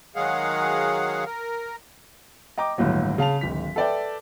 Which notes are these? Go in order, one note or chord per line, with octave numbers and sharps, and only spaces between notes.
D#3 F#3 G#3 G#4 F5 F#5
A#4
D#5 G5 A#5 D6
G1 D#2 A2 F#3
C#3 F5 A5 F7
D1 G#1 B6
A4 B4 D5 E5 G5